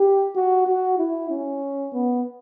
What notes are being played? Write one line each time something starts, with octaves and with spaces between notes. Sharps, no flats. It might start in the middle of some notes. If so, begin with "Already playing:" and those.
Already playing: G4
F#4
F#4
E4
C#4
B3